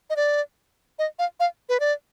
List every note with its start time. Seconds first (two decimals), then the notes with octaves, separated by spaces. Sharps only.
0.10 D#5
0.16 D5
0.99 D#5
1.19 F5
1.40 F5
1.69 B4
1.80 D5